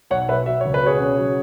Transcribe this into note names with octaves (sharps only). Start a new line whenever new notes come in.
B1 C#5 F#5
B2 B4 E5
F#3 E5
C#2 C#5
B4
B2 G#4 C#5
C#3
F#3